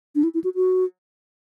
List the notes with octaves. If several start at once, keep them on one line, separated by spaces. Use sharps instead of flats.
D4
E4
E4
F#4
F#4